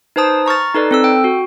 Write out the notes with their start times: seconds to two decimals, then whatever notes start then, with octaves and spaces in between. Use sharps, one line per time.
0.16 D#4 B4 C5 A5 D#6
0.46 A#5 C#6 F6 A6
0.75 D#4 A4 B4 D5
0.91 C4 A4 E6
1.04 G5
1.24 F#4